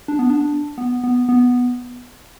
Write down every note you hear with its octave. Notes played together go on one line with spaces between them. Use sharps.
D4
B3
D4
B3
B3
B3